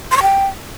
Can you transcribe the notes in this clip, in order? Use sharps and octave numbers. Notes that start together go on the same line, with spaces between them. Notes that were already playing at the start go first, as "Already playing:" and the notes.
C6
C#6
G5